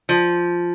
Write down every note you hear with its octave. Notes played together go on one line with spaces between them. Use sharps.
F3